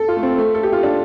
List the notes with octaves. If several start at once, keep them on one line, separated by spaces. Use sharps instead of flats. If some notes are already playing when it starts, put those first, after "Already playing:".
Already playing: A4
F4
A3
C4
A3
A4
G4
F4
D4